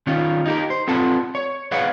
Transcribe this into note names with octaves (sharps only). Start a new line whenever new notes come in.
D#3 C#4 F4
D#4 G4 A#4
C5
C4 F4 A4 B4 F#5 A5
C#5
G#4 B4 C#5 F5 F#5